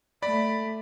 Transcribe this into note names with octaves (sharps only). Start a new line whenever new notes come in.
A3 D5 B5